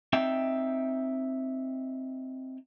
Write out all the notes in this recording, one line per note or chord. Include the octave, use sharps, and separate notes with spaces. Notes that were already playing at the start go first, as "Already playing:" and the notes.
C4 D#4 E5 G5